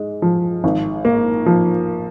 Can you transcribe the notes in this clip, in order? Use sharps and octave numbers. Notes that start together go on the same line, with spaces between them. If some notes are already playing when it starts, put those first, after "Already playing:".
Already playing: G#2 G#3
F3
G#1
A#3
F3